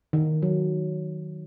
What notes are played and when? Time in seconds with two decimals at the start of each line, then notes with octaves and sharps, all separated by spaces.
0.13 D#3
0.42 F#3